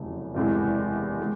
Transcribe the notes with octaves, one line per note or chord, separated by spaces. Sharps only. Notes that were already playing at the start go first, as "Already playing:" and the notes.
Already playing: F1 E2 C#3 F#3
F#1 E2 C3 E3 G#3
G#3